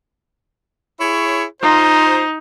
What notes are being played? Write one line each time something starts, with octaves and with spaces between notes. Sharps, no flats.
E4 G#4 C#5
D#4 F4 C5